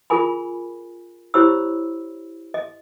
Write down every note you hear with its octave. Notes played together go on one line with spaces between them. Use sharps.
F4 G#4 A#4 G#5 B5
E4 G4 C5 C#5 B5 E6
D#5